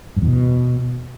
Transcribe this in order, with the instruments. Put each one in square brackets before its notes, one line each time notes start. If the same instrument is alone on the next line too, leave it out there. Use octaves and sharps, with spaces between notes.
[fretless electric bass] G2
E2
B2